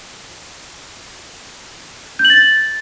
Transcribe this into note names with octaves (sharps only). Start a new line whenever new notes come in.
G6
F#7
A6